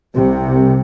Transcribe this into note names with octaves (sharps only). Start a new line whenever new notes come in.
C2 C3